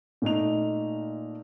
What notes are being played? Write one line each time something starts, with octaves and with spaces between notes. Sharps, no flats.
A#2 A3 D#4 F7